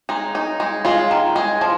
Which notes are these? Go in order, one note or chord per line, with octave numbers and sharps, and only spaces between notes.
G#3 D#4
D#4
G#3
G#3 F4
D#3
G#3
F3